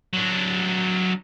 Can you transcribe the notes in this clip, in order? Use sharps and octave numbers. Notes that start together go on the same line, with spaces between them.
F#3 D4